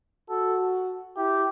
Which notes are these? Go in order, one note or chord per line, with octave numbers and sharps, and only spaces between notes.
F#4 A4
E4 G4